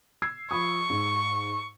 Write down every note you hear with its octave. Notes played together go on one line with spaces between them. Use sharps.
E6 G#6 C7
F3 B5 C#6 D#6
G#2